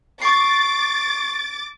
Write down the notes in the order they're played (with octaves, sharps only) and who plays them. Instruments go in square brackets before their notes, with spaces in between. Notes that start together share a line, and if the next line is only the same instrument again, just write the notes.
[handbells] C#6 C7 [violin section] D6 A6